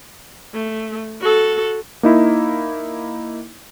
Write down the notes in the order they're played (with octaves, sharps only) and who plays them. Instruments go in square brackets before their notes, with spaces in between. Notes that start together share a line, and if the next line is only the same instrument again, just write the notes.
[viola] A3
F#4 A4
[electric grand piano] A#3 D#4 E4